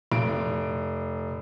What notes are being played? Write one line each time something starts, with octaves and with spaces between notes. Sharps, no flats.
F1 D7